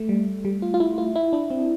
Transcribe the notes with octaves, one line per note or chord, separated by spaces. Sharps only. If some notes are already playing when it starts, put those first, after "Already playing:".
Already playing: A3
G3
G3
F4
F4
E4
F4
E4
D4
C4